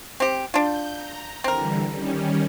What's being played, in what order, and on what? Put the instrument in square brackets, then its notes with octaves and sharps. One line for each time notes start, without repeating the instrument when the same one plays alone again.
[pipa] C4 G4
[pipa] D4 F4 [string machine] G6
[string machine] A#5
[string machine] D3 E3 G3 [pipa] C4 A#4
[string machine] D#3 G3 C#4